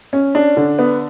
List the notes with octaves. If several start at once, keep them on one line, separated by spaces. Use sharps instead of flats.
C#4
D4
D3
B3